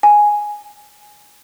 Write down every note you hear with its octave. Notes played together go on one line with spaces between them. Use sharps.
G#5